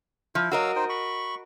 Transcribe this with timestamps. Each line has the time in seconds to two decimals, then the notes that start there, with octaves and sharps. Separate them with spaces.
0.35 F3 E4
0.52 F#3 F#4 A#4 D#5 F5 E6
0.76 D#4 C5 G5
0.89 B5 C#6